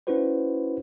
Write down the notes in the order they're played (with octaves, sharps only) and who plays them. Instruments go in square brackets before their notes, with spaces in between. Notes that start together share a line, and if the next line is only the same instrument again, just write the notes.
[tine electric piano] C#4 D#4 E4 F#4 B4 C5